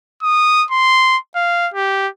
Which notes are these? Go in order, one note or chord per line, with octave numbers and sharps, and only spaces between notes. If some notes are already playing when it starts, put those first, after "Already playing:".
D#6
C6
F5
G4